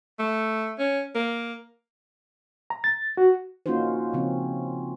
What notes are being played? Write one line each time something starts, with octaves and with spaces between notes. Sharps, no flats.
A3
C#4
A#3
A#5
A6
F#4
A#3 C#4 D#4 F4 F#4 C5
C#3 F3 C4 C#4